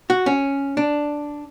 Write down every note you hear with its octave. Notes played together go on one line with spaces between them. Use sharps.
F#4
C#4
D4